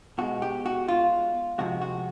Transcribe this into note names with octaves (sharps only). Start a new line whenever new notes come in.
B2 G#3 F#4
G4
F#4
F4
F2 C3 F3 G#3 F#4
F#4